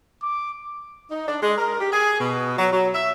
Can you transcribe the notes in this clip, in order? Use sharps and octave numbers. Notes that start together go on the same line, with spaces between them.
D6
D#4
D4
G#3
A#4
G4
G#4
B2
F#3
F#3
E5